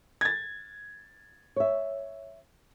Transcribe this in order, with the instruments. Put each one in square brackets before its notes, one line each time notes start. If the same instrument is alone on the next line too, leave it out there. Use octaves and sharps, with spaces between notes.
[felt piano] G#6 A6
[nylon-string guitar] C#5 E5